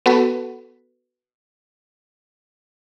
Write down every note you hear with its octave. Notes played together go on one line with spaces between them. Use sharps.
B3 F#4 A4 B4